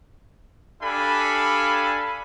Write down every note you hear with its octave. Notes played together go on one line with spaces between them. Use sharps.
D4 G4 A4 F5 G#5 B5